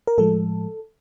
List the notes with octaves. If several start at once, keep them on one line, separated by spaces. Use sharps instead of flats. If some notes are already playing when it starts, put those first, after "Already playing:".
A#4
A2 F3 G#3 A4